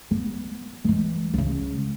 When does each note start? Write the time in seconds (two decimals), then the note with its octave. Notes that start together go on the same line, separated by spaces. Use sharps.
0.11 B3
0.84 E3 G#3
1.34 C#2 C#3